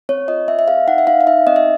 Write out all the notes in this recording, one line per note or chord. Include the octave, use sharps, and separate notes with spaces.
C4 C#5
F4 D#5
C4 E5
E5
G#4 F5
D#4 F#5
E5
D#4 F5
F5
D#4 E5
C4 D#5
E5